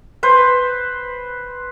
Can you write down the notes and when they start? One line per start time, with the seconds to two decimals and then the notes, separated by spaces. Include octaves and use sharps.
0.23 B4 C5